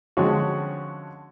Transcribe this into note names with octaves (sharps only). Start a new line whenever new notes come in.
D3 F3 G#3 C4 C#4 F#4